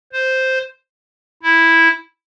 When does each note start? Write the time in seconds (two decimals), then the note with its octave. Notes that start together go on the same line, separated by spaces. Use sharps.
0.13 C5
1.43 E4